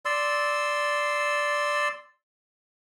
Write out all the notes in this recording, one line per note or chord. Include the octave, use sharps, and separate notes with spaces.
D5 C6 E6